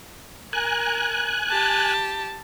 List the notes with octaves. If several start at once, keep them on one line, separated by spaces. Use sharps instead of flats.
A#4 G#5 F#6
G4 A5